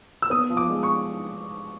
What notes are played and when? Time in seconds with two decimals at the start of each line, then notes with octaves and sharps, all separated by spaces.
0.22 E6
0.30 B3 D#6
0.50 F3
0.57 D6
0.70 G#3
0.83 C#6